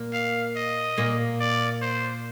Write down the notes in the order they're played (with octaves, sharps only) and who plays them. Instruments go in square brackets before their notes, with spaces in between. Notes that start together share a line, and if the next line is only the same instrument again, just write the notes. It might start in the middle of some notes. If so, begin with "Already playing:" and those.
Already playing: [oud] A#2 A#3
[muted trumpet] F5
D#5
[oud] A#2 A#3
[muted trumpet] D5
C5